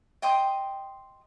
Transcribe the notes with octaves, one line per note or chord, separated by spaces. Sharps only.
D#5 G5 C6 D#6